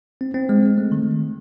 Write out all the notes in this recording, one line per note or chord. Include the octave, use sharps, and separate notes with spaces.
C4
C4
G#3
G#3
A3
D#3